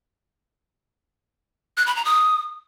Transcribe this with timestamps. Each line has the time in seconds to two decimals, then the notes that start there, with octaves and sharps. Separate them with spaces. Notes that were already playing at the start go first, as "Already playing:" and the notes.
1.77 F#6
1.87 B5
1.96 A#5
2.05 D#6